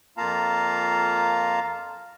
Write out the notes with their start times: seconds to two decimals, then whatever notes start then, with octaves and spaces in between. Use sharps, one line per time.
0.17 F2 A#3 F4 F5 A5 A#5